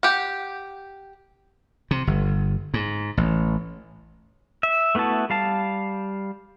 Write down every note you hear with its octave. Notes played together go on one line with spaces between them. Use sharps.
G4 F#5
C3
G1
G#2
A1
E5
A3 B3 E4 F#4 A5
G3 F5 A5